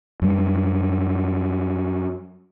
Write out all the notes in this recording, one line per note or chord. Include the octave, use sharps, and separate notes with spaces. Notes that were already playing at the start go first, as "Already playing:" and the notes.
F#2 G3